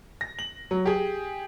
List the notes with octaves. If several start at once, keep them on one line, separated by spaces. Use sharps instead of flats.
A#6
F#7
F#3
G4 G#4